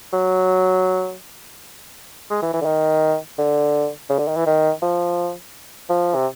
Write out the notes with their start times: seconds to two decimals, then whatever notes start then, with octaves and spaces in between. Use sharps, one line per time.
0.13 F#3
2.30 G#3
2.42 E3
2.54 E3
2.61 D3
2.65 D#3
3.38 D3
4.10 C#3
4.19 D3
4.28 D#3
4.36 E3
4.46 D#3
4.82 F3
5.90 F3
6.15 C3